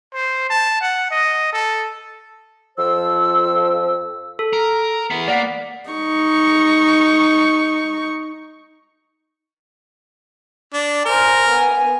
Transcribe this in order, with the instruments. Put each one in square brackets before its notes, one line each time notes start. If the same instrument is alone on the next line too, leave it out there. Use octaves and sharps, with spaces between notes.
[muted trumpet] C5
A5
F#5
D#5
A4
[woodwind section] F2 F3 C5 E6
[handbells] A4
[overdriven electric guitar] A#4
B3 E4
[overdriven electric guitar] A#3 [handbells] D5 F#5 B6
[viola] D#4 C#6
[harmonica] D4
[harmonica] A#4 [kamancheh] C5 G#5
[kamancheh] B3 G#5